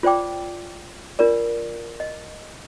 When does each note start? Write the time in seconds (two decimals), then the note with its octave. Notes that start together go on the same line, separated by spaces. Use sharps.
0.03 F4 C5 D5 G5 D6
1.19 D4 F4 A#4 D5
2.00 D#5